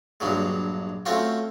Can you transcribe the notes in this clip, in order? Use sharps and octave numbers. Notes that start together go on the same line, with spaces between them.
A#1 G2 F#3 G#3
A3 C4 C#4 F4 F#4